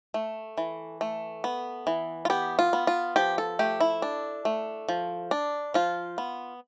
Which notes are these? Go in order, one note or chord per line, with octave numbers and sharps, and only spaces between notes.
A3
E3
A3
B3
E3
F4
B3 G4
F4
B3
F4
F3 G4
A4
A3 G4
E4
D4
A3
F3
D4
F3 F4
B3